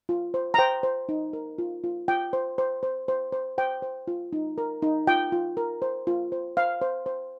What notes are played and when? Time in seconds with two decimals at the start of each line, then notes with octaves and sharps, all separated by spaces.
0.09 F4
0.34 C5
0.54 A#5
0.58 C5 G5
0.83 C5
1.09 D#4
1.33 A#4
1.58 F4
1.84 F4
2.08 F4 G5
2.33 C5
2.58 C5
2.83 C5
3.08 C5
3.33 C5
3.58 C5 G5
3.82 C5
4.08 F4
4.33 D#4
4.58 A#4
4.82 D#4
5.07 F4 G5
5.32 F4
5.57 A#4
5.82 C5
6.07 F4
6.32 C5
6.57 C5 F5
6.82 C5
7.06 C5